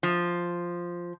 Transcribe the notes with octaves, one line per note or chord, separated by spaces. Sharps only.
F3